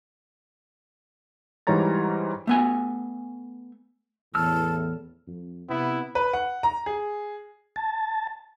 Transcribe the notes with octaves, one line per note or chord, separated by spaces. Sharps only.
G#2 E3 G3 C#5 A#5 A6
A3 B3 G#5
E2 A2 A5 E6 F6
F2
C3 B3 E4
B4
F#5
A#5
G#4
A5